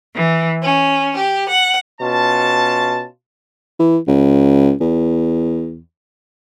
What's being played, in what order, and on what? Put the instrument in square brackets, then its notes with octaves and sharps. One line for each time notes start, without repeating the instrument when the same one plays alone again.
[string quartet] E3
C#4
G4
F#5
[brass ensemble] B2 C#4 F4 A5
[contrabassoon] E3
C#2
E2